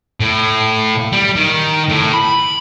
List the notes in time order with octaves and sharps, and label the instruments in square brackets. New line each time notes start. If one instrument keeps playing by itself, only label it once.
[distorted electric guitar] A2
G3
D#3
A2
B5